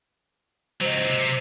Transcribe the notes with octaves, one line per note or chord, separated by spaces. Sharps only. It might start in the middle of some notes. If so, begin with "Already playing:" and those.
C#2 F#3 C5 D#5
C3